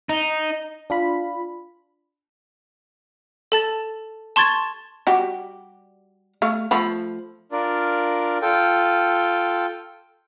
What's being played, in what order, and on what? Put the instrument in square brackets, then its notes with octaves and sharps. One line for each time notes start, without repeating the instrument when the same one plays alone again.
[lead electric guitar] D#4
[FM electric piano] D4 F4 B5
[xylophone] A4 A5 A6
A5 C6 C#6 G#6 A6
[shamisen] G3 F#4 G4
A3 F5
F3 A3 B5
[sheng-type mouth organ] D4 F4 A#4 D5
F4 A4 G5